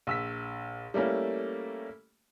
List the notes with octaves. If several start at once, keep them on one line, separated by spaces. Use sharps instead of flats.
A#1 E6 B6
G3 A3 A#3 C#4 E4